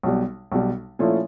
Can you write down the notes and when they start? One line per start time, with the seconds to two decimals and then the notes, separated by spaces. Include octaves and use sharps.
0.03 B1 B2 G3
0.52 B1 B2 G3
0.99 A#2 F3 A3 C#4 E4